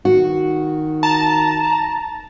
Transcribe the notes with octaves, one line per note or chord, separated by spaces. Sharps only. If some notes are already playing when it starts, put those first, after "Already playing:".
D#3 F#4
A5 A#5